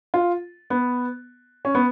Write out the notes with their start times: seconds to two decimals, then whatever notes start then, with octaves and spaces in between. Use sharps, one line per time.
0.14 F4
0.70 B3
1.65 C#4
1.75 B3